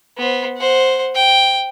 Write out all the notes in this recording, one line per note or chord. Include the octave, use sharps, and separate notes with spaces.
B3 C5
C5 F#5
G5